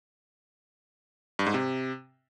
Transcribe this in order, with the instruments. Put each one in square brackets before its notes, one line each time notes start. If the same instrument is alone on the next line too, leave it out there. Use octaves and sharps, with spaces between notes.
[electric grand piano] G2
G#2
C3